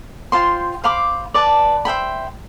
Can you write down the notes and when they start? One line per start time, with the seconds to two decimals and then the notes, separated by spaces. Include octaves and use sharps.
0.32 F4 C5 G5 C6
0.84 C5 F5 B5 D6
1.34 B4 D5 A5
1.85 C5 E5 G5 B5